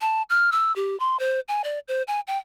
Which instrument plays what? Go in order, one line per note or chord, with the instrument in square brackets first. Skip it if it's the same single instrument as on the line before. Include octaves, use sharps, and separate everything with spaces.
[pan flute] A5
F6
E6
G4
C6
C5
G#5
D5
C5
G#5
G5